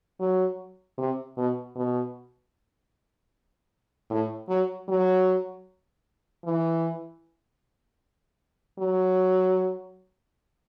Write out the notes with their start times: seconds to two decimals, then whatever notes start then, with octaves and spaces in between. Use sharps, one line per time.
0.20 F#3
0.98 C3
1.37 B2
1.76 B2
4.10 A2
4.49 F#3
4.89 F#3
6.44 E3
8.79 F#3